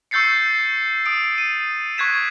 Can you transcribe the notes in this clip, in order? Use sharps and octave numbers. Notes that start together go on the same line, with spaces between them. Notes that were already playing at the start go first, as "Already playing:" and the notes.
C#6 E6 G6 A6 C7 C#7
D#6 D7
D#7
C#6 F#6 G#6 B6 E7